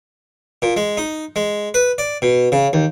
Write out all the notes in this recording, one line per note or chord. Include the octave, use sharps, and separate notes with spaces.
A#2
G#3
D#4
G#3
B4
D5
B2
C#3
D#2